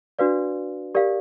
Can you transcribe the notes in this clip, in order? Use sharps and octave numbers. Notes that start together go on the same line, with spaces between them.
D4 F#4 B4 D5 F5
G4 A#4 D5 F5